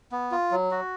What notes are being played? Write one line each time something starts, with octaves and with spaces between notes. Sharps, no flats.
B3
F4
F#3
F#4